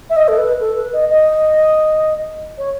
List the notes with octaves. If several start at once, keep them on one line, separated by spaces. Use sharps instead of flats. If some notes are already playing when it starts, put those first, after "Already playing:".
E5
D#5
A4
B4
A4
B4
D#5
D#5
C#5